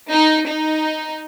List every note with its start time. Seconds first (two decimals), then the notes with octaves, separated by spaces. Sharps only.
0.12 D#4
0.48 D#4